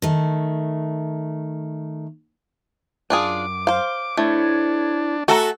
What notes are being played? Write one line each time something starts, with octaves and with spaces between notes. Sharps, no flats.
D#3 A3
F#2 D4 F4 G#4 D6
C5 F5
A3 D4 E4 C5 C#5
A3 F#4 A4 A#5